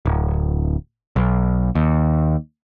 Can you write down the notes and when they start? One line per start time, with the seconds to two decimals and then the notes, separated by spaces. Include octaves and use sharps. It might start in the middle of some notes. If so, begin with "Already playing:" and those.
0.06 D1
1.16 B1
1.75 D#2